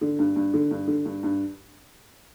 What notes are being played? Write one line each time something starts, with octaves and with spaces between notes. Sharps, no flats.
D3
G2
G2
D3
G2
D3
G2
G2